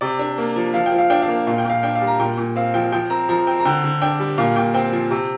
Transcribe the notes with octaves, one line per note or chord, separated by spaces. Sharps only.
C3 D5
D4
A#3
F3
F3 F5
G5
F3
F5
D4 G5
F5
A#3
A#2 F5
G5
A#2 F5
D4 G5
F5
G3
A#5
A#2 G5
A#2
C4 F5
F3 G5
F3 G5
C4 A#5
F3 A#5
C4 G5
A#5
D3 G5
D3
D4 G5
G3
A#2 F5
A#2 G5
C4 G5
F3
C3